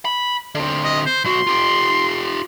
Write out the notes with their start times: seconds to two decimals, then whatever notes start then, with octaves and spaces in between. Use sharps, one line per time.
0.05 B5
0.55 D3 C4
0.85 D#5
1.06 C5
1.25 B1 F#4 C6
1.47 F4 G4